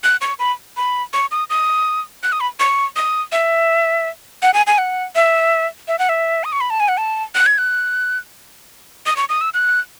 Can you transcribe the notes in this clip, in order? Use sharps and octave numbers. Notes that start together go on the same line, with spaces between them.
F#6
C#6
B5
B5
C#6
D#6
D#6
F#6
D#6
B5
C#6
D#6
E5
F#5
G#5
G#5
F#5
E5
E5
F#5
E5
D#6
C#6
B5
A5
G#5
F#5
A5
F#6
G#6
F#6
D#6
C#6
D#6
E6
F#6